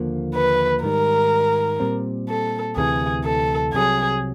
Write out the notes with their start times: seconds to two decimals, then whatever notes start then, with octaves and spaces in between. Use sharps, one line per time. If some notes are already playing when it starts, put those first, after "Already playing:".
Already playing: D#2 D3 F3 A#3
0.35 B4
0.84 G#2 D#3 G3 A#4
1.80 A#2 G3 C4
2.29 A4
2.77 D2 C3 E3 G#4
3.24 A4
3.73 C2 C3 D#3 F#3 G#4